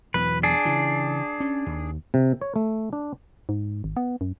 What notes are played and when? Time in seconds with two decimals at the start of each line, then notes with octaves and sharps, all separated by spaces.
0.14 E2 B2 F#3 B4
0.43 D4 G#4
0.65 C#3 E3
1.40 C#4
1.67 D#2
2.14 C3
2.41 C#5
2.56 A3
2.93 D4
3.49 G#2
3.84 G#1
3.96 B3
4.21 F#2